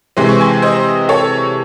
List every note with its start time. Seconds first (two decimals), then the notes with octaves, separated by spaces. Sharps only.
0.17 C3 E3 G#3 C4 C6
0.29 C#6
0.41 G#5 C6
0.62 C5 D#5
1.09 A4 C#5